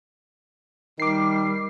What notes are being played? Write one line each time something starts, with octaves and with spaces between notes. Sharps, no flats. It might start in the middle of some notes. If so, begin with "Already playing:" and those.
D#3 G3 D6 C7